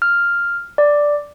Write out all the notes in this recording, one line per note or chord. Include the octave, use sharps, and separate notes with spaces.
F6
D5